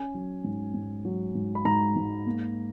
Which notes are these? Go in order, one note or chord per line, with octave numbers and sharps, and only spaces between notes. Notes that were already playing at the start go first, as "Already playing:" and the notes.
Already playing: C#4 G#5
F#3
G#2
G#2
F#3
G#2
B5
G#2 A#5
G#2
A#3